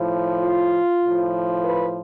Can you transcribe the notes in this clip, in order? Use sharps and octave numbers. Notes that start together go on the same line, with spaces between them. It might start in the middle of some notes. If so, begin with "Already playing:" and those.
Already playing: A2 F3
F4
A2 F3
B4